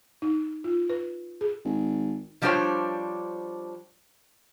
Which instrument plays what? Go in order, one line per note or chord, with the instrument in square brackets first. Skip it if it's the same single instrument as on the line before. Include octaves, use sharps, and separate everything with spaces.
[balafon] D#4
F4
B4
G#4
[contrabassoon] G#1
[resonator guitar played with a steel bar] F3 G3 D4 G4 C5 C#5